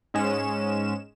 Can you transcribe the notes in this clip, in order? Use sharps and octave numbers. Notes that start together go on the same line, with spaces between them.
G#2 G#3 C#4 E7